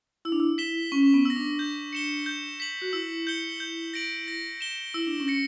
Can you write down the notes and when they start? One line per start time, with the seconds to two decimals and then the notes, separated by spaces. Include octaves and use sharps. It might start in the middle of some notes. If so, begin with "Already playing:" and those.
0.25 E4 E6
0.32 D4
0.40 E4
0.58 B6 E7 G7
0.92 C#4 C#6
1.03 C#4
1.14 B3
1.25 E6 A#6
1.37 D4
1.59 G6
1.93 C#7 E7 G7
2.26 G6
2.60 B6 F#7
2.82 F#4
2.93 E4 E6
3.27 G6 C#7 G7
3.60 G6
3.94 A#6 D7 F#7
4.28 A#6
4.61 E7 G7
4.94 E4 E6
5.07 D4
5.20 C#4
5.28 A#6 C#7